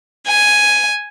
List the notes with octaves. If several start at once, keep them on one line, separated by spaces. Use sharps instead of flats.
G#5